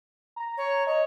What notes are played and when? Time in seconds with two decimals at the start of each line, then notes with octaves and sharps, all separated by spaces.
0.36 A#5
0.58 C#5
0.87 C#5 D#5